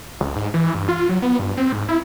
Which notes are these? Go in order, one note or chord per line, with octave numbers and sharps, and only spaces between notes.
C#2
G#2
E3
G2
F4
F#3
B3
G2
C4
G#2
E4